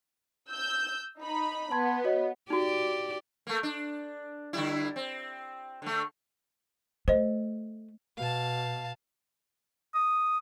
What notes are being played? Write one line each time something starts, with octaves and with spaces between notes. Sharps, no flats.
E6 G6
D#4 B5
B3 A5 C6 G#6
F#4 C#5 D#5
D#4 F#4 G4 D5
A3 A#3
D4
D3 G3 E4
C4
D3 A3
A3 C5 D#5
B2 F5 A5
D#6